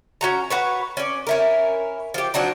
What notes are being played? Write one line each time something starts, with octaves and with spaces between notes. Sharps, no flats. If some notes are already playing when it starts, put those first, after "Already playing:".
C#4 F#4 A#5
F#4 B4 C#5
C#4 D5
C#4 E4 A#4
F3 G4
F3 F#3 D4 D#4